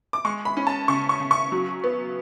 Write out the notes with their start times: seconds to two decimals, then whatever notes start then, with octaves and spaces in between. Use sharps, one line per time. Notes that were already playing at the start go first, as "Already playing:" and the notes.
0.13 D6
0.25 G#3 C#6
0.45 B5
0.57 C#4
0.67 A5
0.88 C#3 C#6
1.09 C#6
1.20 C#3
1.31 C#6
1.52 F#3
1.84 B3